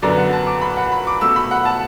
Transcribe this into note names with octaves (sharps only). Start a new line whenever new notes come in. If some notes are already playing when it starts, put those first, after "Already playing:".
F#2 D3 B3 D5
F#5
A5
D6
B5
F#5
B5
D6
B2 A3 E6
B5
F#5
A5